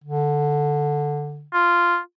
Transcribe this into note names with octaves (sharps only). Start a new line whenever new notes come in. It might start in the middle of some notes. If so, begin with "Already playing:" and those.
D3
F4